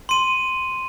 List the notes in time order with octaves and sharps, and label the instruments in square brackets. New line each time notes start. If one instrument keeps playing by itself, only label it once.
[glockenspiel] C6 D#7